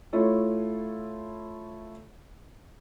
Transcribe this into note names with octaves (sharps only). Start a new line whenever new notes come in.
A3 E4 F4 A4 C#5